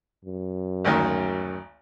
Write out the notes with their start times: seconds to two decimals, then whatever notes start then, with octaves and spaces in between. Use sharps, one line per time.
0.25 F#2
0.85 G#1 D2 D#3